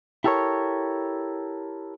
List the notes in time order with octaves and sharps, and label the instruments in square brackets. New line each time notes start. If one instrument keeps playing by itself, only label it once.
[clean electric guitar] E4 G4 A4 A#4 C#5